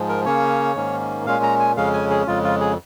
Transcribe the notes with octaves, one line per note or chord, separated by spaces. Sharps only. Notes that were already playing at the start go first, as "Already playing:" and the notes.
Already playing: G#2 F3 G#3
A#4
C#3 A#3 C#4 C#5
G#2 D#3 A#3 C#4
A#2 G#3 C#4 F5
A#5
G#5
F2 C#3 G#3 C#4 F5
G#5
G#4
F2 C#3 G#3 F4
F4
G#4